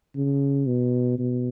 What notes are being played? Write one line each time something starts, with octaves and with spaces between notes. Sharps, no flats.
C#3
B2
B2